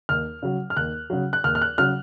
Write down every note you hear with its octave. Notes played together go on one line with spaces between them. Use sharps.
D#2 F6
C#3 F#3
F6
D#2 F#6
C#3 F#3
F#6
D#2 F6
F6
F#6
C#3 F#3 F6